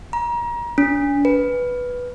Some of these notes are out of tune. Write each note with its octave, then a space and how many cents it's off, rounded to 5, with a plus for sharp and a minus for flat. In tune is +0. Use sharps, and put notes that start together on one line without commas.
A#5 +30
D4 -45
B4 -5